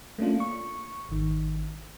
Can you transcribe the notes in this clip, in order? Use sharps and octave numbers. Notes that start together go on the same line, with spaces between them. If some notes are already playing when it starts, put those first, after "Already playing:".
A3 A#3 C#4 D4 F4
C#6
G#1 D#3